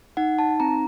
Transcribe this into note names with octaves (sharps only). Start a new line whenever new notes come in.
D#4 F#5
A5
C4 A#5